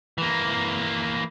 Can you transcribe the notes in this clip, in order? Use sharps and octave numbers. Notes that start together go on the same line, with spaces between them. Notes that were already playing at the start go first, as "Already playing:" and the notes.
E3 A#3